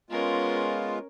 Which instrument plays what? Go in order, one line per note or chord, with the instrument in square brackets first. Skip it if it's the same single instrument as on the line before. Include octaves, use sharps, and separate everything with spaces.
[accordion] G#3 B3 F4 [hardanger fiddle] C#4 A#4